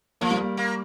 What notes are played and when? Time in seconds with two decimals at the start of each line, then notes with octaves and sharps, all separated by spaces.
0.21 F3 A#3
0.31 G3
0.40 A#3
0.57 A#3